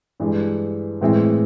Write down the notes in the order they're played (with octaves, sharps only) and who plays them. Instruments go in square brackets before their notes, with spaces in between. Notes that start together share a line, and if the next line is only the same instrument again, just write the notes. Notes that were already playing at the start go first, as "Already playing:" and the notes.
[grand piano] G2 E3 G#3
A2 E3 G#3 C4 E4